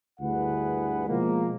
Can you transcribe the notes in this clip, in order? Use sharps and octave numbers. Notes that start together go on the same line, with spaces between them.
D2 G2 E4 G#4 B4 F#5
B2 F3 G#3 A#3